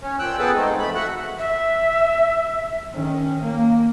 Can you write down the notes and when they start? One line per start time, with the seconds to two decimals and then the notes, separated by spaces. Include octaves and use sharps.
0.02 C#4
0.19 A#2 F3 G5 E6 F#6
0.38 B3 G#4 A4 B4 G5 A5
0.54 G#3 A3 C4 D#4
0.79 F2 F3 A3 B5
0.95 F#4 E5 F#5 F#6
1.38 E5
2.93 D#3 C#4
3.42 A#3